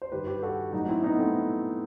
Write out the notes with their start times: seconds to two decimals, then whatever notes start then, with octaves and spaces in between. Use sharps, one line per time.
0.02 C5
0.12 G2 D#3 G3 G4 B4
0.27 G4 B4
0.43 F#4 A4
0.73 A2 F#3 D#4 F#4
0.84 D#4
0.88 C4 E4
1.03 B3 D#4
1.18 A3 C4